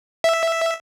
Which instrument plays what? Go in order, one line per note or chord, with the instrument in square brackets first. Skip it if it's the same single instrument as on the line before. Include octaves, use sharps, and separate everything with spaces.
[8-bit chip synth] E5